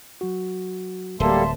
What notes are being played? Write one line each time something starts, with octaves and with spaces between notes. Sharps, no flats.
F#3 F#4
D1 G3 A#3 A4 E5 A5 C6